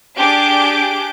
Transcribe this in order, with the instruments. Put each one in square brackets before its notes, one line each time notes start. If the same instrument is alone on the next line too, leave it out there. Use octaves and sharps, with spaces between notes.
[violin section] D4 G4 G#4 D6 G6 D7